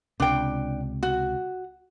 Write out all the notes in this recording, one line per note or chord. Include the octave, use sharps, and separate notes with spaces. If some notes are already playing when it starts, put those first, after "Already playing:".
C#2 C3 D4 G5
F#4